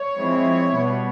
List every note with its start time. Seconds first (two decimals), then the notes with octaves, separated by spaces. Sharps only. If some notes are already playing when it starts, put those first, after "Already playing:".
Already playing: C#5
0.18 F3 G#3 C4 E4
0.74 B2 G3 B3